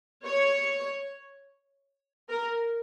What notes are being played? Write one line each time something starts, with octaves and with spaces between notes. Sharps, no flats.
C#5
A#4